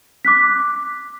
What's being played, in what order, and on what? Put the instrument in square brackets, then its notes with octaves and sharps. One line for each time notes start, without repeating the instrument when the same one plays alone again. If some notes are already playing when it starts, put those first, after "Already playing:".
[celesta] D6 F#6 B6